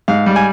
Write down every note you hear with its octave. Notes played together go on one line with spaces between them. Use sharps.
G#2 F5
G3
G#5